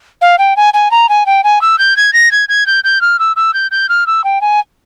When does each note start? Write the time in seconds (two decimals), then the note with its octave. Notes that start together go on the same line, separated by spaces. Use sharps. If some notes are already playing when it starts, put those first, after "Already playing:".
0.22 F5
0.39 G5
0.57 G#5
0.74 G#5
0.91 A#5
1.09 G#5
1.26 G5
1.44 G#5
1.62 E6
1.79 G6
1.97 G#6
2.13 A#6
2.32 G#6
2.49 G#6
2.66 G6
2.84 G6
3.01 F6
3.19 E6
3.36 E6
3.54 G6
3.71 G6
3.89 F6
4.07 E6
4.24 G5
4.41 G#5